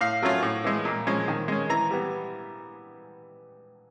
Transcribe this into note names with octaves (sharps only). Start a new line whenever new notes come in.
A2 F5
F#3 A3 C#4 F4
A2
E3 G#3
A#2
F3 G#3 C#4
D#3
G#3 C#4
E3 A#5
G3 B3